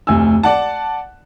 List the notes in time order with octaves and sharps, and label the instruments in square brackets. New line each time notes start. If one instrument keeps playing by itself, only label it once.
[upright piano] F1 D2 G#5 E6
D5 F#5 A5